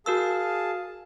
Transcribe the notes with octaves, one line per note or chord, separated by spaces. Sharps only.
F#4 G#4 A#4 F5 A5 E6